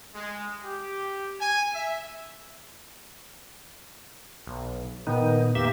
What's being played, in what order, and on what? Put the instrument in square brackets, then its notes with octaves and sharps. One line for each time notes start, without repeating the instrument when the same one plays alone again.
[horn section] G#3
G4
G#5
E5
[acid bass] B1
[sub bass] A#2 [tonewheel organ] D#3 D#4 [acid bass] B3
[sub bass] F2 [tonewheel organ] A#3 G4 E5